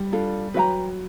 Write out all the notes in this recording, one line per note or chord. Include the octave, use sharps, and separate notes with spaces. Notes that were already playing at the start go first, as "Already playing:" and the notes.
Already playing: G3
D4 F4 A4
F#3 B4 E5 G5 A#5